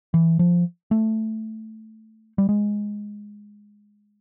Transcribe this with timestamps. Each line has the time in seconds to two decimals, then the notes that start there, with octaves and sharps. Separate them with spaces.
0.14 E3
0.39 F3
0.91 A3
2.38 G3
2.49 G#3